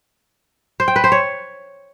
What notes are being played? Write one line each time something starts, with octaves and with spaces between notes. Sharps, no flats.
C5
G5
B4
C5
C#5